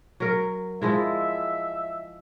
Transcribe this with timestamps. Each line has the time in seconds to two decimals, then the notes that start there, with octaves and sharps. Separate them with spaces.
0.20 F#3 A#4
0.82 F3 G#3 E4 E5